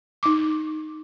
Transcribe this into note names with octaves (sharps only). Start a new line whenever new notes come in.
D#4 D6